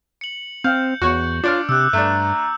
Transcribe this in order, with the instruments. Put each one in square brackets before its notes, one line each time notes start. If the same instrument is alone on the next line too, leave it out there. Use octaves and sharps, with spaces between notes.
[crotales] C#7 F#7
[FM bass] C4 [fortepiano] F5 [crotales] G6
[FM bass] E2 [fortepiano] F#4 C#5
[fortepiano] D4 D5 F6 [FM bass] F4 [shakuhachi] C#5 [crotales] D6
[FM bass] C3 [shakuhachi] D6 [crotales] E6 F#6
[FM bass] G2 [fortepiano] A3 D4 [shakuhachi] A#5